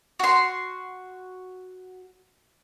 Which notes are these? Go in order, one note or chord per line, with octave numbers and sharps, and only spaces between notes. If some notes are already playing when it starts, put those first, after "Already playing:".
F#4 C6